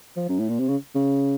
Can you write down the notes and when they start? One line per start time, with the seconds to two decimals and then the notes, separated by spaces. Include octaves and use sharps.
0.17 F3
0.29 F#2
0.40 A2
0.49 A#2
0.60 C3
0.69 C#3
0.95 C#3